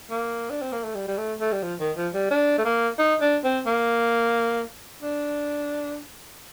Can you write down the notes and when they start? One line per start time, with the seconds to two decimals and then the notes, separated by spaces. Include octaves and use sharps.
0.10 A#3
0.50 D4
0.62 C4
0.73 A#3
0.84 A3
0.95 G3
1.08 G3
1.18 A3
1.41 A3
1.52 G3
1.63 F3
1.80 D#3
1.97 F3
2.14 G3
2.31 D4
2.58 A3
2.65 A#3
2.99 D#4
3.21 D4
3.44 C4
3.67 A#3
5.02 D4